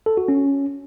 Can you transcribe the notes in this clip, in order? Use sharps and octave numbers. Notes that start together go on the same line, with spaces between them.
A4
F#4
C#4